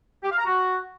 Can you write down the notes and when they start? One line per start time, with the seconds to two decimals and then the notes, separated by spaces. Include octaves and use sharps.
0.23 G4
0.31 F5
0.39 A#5
0.46 F#4